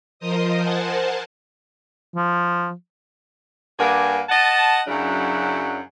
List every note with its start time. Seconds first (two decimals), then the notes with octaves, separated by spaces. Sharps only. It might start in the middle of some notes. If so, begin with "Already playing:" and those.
0.19 F3 A#4 C5 D#5 D#6
0.61 A#4 C5 F#5 G#5 A5
2.15 F3
3.79 G2 A#3 F#5 G#5
4.29 D#5 F#5 A5
4.87 F#2 C#3 F#3 D4 E4